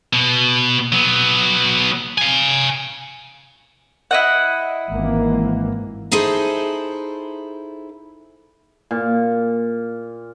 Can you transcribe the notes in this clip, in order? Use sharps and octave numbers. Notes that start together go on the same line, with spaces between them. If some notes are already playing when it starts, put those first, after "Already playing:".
B2
F#3 B3
F5 G#5
E4 D#5 F#5
G#1 E3 A#3
D#4 E4 G#4 A4 C5
A#2